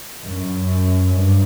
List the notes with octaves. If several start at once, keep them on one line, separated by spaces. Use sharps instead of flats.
F#2
G2